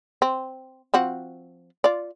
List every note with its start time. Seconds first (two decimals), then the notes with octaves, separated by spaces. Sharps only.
0.22 C4
0.94 F3 C4 F#4
1.84 F4 D5